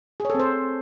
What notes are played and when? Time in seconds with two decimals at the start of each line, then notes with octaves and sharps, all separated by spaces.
0.20 G#4
0.25 C#5
0.30 A4
0.35 C4
0.39 C5